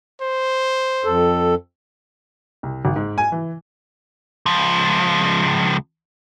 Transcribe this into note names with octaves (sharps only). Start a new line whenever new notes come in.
C5
F2 A4
C2
G#1
G#2
G#5
E3
C#2 F3